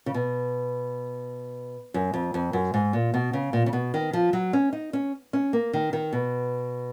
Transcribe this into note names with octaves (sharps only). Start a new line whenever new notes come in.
C#3
B2
F#2
F2
F2
F#2
G#2
A#2
B2
C#3
A#2
C#3
B2
D#3
F3
F#3
C#4
D#4
C#4
C#4
A#3
D#3
D#3
B2